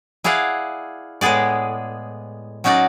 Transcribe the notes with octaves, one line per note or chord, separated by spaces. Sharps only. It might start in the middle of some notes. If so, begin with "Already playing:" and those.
E4 G#4 D5 F5 F#5
A2 G#3 B3 G#4 D5
F#3 C#4 D#4 F#4 D5